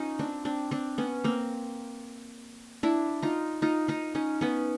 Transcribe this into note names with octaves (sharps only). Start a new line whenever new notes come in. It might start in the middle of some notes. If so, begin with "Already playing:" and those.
Already playing: C#4 D#4 F4
C4 D4
C4 D4
C4 D4
B3 C#4
A#3 C4
D4 E4
D#4 F4
D#4 F4
D#4 F4
C#4 D#4
B3 C#4